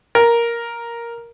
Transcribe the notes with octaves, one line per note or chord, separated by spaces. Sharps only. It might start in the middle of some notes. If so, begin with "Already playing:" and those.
A#4